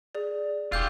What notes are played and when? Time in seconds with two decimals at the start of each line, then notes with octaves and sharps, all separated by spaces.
0.15 G#4 D5
0.72 E1 F4 G4 E6 G6 A6